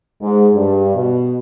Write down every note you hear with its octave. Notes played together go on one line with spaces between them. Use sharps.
G#2
G2
B2